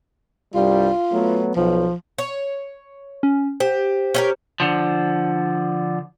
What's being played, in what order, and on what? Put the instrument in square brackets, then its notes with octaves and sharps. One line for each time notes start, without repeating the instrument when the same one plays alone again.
[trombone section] C2 G2 G3 [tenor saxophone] F4
[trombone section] F#3 A3 B3
[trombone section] B1 [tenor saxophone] F3
[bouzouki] C#5
[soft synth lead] C#4
[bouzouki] G4 [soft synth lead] C5
[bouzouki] C#4 G4 A#4
[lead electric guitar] D3 F3